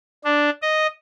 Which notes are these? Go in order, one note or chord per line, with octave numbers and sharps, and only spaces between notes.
D4
D#5